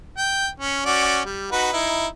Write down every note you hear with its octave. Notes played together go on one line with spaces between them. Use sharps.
G5
C#4
C#4 F#4 D5
G3
D#4 F#4 B4
D#4 E4